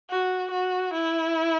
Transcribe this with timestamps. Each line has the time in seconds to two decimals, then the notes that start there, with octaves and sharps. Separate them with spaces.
0.10 F#4
0.51 F#4
0.94 E4